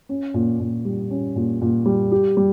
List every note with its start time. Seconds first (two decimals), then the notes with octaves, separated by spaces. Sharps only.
0.09 C#4
0.34 A#2
0.60 A#2
0.85 G3
1.10 C#4
1.36 A#2
1.61 A#2
1.86 G3
2.12 G4
2.37 G3